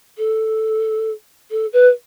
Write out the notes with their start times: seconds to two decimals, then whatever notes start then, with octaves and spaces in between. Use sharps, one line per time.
0.18 A4
1.50 A4
1.73 B4